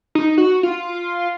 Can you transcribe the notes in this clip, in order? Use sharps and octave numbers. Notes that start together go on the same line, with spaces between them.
D#4
F#4
F4